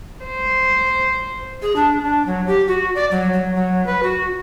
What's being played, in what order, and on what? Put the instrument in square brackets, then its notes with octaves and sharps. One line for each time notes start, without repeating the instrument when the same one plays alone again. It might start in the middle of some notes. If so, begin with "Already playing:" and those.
[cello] C5
[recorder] G#4
D4
D4
F#3
G4
F#4
D5
F#3
F#3
F#3
B4
F#4